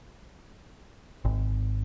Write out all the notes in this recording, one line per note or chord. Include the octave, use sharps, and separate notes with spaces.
G#1